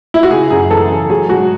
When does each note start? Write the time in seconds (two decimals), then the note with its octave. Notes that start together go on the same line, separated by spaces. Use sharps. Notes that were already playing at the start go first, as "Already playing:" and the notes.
0.14 E4
0.23 F#4
0.31 C#3 G#4
0.50 F#2 G#4
0.71 E3 A4
0.91 C#3
1.10 F#3 G#4
1.29 G#2 F#4